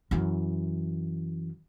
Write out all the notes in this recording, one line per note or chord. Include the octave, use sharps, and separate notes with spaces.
F#2 E3